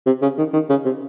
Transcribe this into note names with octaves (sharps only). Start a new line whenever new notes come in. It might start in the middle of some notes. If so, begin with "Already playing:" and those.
C3
C#3
D#3
D#3
C#3
C3